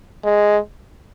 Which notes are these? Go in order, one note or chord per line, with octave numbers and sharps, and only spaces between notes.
G#3